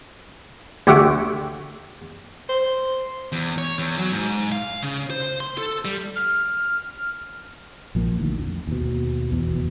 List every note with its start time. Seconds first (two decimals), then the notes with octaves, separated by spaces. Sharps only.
0.87 D2 G4 E5 F#5 C#6 D6
2.49 C5
3.32 E2
3.58 C#5
3.79 E2
3.98 F#3
4.12 G#2
4.52 F5
4.83 C#3
5.10 C5
5.40 C6
5.58 A4
5.85 G3
6.16 F6
7.95 A#1 F3 A#3
8.19 D2 D#3
8.39 F2
8.67 D#2 B2
9.32 E2 B2
9.52 F1